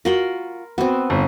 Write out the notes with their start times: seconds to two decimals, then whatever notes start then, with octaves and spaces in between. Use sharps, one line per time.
0.05 F4 F#4 A#4 B5 C6
0.78 B3 C4 F#4
1.10 G1